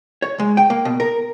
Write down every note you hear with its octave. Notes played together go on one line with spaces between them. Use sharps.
C#5
G#3
G5
A#3
B2
A#4